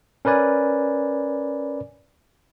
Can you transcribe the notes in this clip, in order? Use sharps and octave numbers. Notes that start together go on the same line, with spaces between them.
C#4 A#4 B4 D5 G#5